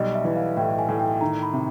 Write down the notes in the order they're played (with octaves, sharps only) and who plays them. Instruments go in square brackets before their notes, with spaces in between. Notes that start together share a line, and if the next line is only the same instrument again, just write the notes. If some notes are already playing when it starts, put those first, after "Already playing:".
Already playing: [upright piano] B1 G3 [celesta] D#5
[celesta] E5
[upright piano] E3
[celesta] F5
[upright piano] A2 [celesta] G5
[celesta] G#5
[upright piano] A2
[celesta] G5
[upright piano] D#3 [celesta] A#5
[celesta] B5
[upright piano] C3